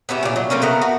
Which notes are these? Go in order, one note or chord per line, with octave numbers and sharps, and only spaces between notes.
B3 C#4 E4 G4
A#2 D4
F#3
A3 A#3 C4 C#4
A3 B3 A#4
F#4